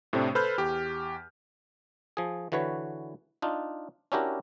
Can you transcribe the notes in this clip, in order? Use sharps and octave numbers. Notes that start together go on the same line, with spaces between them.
A2 C3 A3 C4 D4
A4 B4 C5 B5 F6 G6
E2 G4
F3 G#4
D3 E3 F#4 B4 C#5
D4 D#4 F4
C#4 D4 E4 F#4 G4 A#4